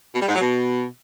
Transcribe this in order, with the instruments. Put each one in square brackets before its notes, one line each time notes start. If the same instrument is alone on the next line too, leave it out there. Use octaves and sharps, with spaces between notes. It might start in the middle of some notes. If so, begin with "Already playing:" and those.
[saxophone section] B2
G3
G#2
F#3
B2